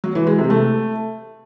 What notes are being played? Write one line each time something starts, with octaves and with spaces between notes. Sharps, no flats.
F#3
E3
G#3
C3
A3